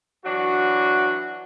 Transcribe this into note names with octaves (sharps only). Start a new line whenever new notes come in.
E3 F#3 D4 F#4